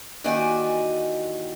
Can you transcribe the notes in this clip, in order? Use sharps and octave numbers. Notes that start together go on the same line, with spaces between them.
D#2 D#3 E3 F#4 D5 G#5